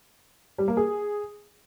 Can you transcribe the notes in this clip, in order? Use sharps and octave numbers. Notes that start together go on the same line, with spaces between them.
G3
A#3
G#4